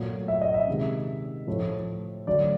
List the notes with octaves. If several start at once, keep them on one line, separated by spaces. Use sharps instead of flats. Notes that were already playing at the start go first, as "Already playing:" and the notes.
Already playing: A#2 F#3 A3
E5
D#5
E5
C3 D#3 G#3
A2 F3 A3
D3 F#3 A3 D5